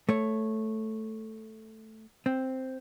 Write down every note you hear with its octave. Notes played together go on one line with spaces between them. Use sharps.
A3 C#5
C4